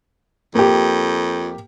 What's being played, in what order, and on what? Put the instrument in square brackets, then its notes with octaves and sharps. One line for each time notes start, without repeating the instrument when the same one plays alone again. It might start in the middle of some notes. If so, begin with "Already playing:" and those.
[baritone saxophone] F2 [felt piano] A#3 G4